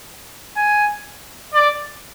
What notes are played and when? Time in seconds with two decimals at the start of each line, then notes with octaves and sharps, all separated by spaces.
0.56 G#5
1.54 D5